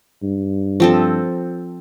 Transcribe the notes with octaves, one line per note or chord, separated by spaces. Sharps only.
G2
F3 C4 A4